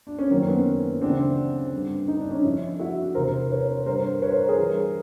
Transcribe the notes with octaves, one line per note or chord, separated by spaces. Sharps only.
D4
C#4
F#2 D#3 A#3 C4
B3 C#4
D2 C#3 E3 C4 D4
G2 D3
D#4
D4
C#4 D#4
F2 D3 D4 E4
E4 F#4
E2 C3 E3 A#4 C5
B4 C#5
G2 D3 A#4 C5
B4 C#5
A#4 C5
G#4 A#4
G2 E3